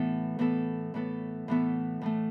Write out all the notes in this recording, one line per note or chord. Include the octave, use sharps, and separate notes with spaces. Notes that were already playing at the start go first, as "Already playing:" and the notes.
Already playing: A2 E3 B3 A4
A2 E3 B3 A4
A2 E3 B3 A4
A2 E3 B3 A4
A2 E3 A3